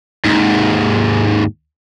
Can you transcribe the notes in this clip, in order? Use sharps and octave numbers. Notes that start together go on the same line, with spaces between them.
D#2 G#2